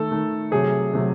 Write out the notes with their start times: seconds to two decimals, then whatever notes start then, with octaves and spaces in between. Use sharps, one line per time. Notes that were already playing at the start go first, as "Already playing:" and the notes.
Already playing: D#3 A3 A4
0.11 D#3 A3
0.51 C3 F#3 A3 G#4
0.93 C3 F#3 A3